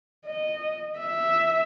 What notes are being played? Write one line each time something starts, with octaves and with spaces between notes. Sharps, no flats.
D#5
E5